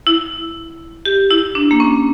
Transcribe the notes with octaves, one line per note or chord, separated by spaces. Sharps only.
E4
G4
E4
D4
A#3
C#4